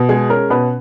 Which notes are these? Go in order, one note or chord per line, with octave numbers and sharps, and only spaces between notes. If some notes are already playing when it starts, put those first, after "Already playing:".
Already playing: B2
G#3 G#4
C#4 A#4
B2 B4